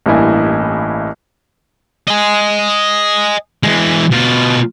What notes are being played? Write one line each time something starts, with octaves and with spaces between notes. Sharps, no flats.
A1 G2 A#3 E4 D#5 G#5
D#5 G#5
E3 G#3
B2 F4